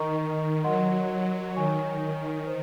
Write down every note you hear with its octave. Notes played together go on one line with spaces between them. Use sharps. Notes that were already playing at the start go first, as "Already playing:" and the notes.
Already playing: D#3 A#4 D#5 A#5 C#6
D#3
F#3 A#4 D#5 F#5 C6
D#3 C#5 G#5 C#6
C5